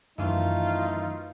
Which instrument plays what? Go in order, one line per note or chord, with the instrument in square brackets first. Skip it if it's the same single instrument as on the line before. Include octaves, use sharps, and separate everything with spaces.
[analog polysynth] F#2 D#3 E3 [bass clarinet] A3 [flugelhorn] D#4 [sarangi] F4